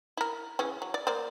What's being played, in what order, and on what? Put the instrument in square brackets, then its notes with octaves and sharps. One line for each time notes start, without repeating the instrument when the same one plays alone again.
[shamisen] E4 A#4
C#3 E3 C#4
F#3
D5
A#3 C5 D5